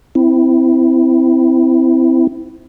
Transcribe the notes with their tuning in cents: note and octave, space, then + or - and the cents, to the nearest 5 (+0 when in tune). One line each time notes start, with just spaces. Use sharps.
C4 -15 E4 +0